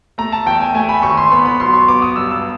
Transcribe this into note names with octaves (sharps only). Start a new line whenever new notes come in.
A3 A#5
A5
E2 G5
G#5
A3 G#5
B5
G#1 C#6
C6
B3 B5
B5
B1 C6
C#6
B3 D6
D#6
G2 E6
E6